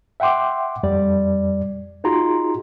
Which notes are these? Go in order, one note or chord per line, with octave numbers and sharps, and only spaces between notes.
E5 F#5 G5 C6 D6
F2 G3 D5
D#4 F4 F#4 G#4 A#5 C6